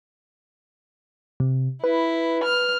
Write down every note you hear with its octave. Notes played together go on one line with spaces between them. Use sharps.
C3
E4 B4
F6